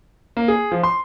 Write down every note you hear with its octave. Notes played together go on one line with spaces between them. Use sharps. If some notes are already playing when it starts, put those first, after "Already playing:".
A#3
G#4
F3
C6